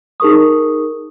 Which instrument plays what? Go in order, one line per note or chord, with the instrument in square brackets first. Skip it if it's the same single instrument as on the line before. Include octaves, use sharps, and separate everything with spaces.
[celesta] D#4 G#4 A#4 C#6 D#6